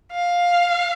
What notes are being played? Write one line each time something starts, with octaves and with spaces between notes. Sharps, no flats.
F5